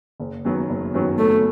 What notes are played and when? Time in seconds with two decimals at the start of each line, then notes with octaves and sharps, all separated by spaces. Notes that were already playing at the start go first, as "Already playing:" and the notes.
0.20 F#1
0.45 F#2 D#3 F#3 B3
0.69 F#1
0.94 F#2 D#3 F#3 B3
1.18 F#1 A3